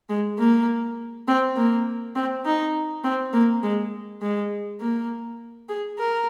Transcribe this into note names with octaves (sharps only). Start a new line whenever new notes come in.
G#3
A#3
C4
A#3
C4
D#4
C4
A#3
G#3
G#3
A#3
G#4
A#4